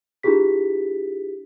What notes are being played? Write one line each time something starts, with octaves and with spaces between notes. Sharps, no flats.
D4 E4 F4 G4 G#4 B6